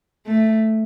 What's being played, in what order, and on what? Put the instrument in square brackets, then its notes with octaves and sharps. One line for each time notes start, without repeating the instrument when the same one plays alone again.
[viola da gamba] A3